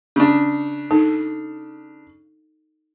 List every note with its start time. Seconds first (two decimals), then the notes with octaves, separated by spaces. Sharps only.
0.16 C#3 D4
0.91 D#4 A4